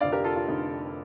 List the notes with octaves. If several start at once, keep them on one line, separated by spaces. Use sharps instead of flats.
F1 F2 D3 D5 F5
G4 A#4
F4 A4
F4
F1 F2 D3 D#4